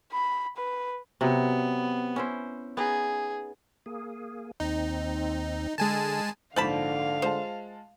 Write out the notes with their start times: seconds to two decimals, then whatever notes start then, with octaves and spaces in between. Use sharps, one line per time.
0.12 B5
0.57 B4
1.21 C3 F#3 B3
2.16 C#4 E4 C5
2.77 B3 D#4 G#4
3.86 A#3 G#4
4.60 D#2 C4 D#4
5.78 D3 G#3 G#5 A5 E6
6.56 A#1 G#2 D3 F3 F5 A5 B5
7.22 G#3 F4 C5 A5